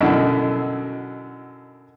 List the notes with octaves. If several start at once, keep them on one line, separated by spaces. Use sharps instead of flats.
F#2 B2 D3 E4 A4 D#5